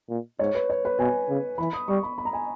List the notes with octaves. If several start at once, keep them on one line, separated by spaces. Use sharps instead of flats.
A#2
G#2 C#5
B4
C#5
B4
B2 G#5
C#3
E3 B5
D#6
G3 C#6
B5
B5
A#5
G#5